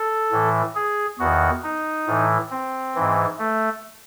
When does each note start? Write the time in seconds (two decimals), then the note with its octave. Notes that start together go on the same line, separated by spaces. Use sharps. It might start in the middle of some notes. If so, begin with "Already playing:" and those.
Already playing: A4
0.32 A2 E3
0.76 G#4
1.19 E2 D#3 F#4
1.64 D#4
2.07 A2 E3
2.51 C4
2.95 G#2 E3
3.39 A3